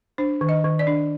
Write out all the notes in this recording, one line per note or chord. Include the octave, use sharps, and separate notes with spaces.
D4 C5
D#3
D#5
D#3
D5
D4